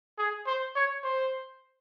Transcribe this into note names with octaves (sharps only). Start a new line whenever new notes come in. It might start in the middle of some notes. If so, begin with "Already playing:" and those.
G#4
C5
C#5
C5